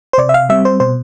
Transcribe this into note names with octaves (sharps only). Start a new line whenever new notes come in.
C5
C3 D5
E5
F5
G3 C4 E5
C5
B2 C5